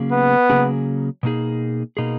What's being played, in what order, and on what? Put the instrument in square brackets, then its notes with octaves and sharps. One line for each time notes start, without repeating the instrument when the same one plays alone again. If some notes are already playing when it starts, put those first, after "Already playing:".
Already playing: [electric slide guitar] C#3 F#3 A#3 C#4 G#4
[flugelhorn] B3
[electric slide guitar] C#3 F#3 A#3 C#4 G#4
B2 A#3 D#4 G#4
B2 A#3 D#4 G#4